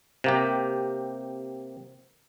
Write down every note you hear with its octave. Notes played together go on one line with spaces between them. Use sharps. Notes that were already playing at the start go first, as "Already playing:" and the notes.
C3 A#3 G4